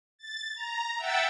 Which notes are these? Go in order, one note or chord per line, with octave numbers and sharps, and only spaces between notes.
A6
A#5
E5 F#5 G5 E6 A6